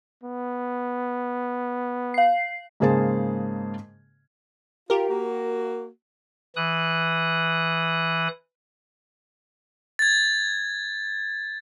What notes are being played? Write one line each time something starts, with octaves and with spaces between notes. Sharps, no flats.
B3
F5 C7
G#2 C#3 A#3 G#4 C5 A5
F4 G4 A#4
A#3 F#4
E3 D#6 F#6
G#6 A6